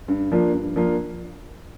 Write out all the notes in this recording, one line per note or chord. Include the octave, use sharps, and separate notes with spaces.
G2
F3 A#3 D4 F4
G2
F3 A#3 D4 F4